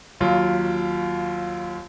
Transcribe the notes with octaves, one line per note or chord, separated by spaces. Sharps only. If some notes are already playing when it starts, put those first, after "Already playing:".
D#2 F#3 F4